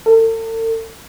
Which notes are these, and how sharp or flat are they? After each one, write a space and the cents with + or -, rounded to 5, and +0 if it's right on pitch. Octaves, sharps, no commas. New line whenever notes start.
A4 +45